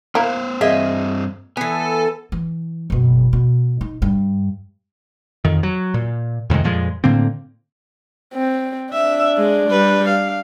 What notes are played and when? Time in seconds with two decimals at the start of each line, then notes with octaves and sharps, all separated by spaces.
0.15 A#3 B3 E4 A#4 C5
0.61 G2 A#3 C4 G#4 D#5 E5
1.57 E3 B3 A4 G#5
2.32 E3
2.90 F#1 B2
3.33 B2
3.81 D#4
4.02 G2
5.45 F2 D#3
5.63 F#3
5.94 A#2
6.50 F2 C3 D#3 G#3
6.64 F2 A#2 F3 G#3
7.04 A2 D3 A#3 C4
8.34 C4
8.94 D4 E5
9.38 G#3
9.70 G3 B4
10.08 F5